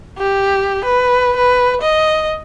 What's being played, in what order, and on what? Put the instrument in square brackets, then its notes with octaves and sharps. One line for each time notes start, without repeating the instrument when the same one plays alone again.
[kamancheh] G4
B4
B4
D#5